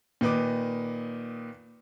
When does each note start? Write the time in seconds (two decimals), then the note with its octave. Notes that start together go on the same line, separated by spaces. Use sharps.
0.21 A#2 D#3 B4 D#5 D6